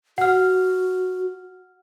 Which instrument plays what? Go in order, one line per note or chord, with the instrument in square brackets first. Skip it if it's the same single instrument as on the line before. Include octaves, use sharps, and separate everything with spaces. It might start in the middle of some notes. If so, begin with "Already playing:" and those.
[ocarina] F#4 [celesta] F#5 F6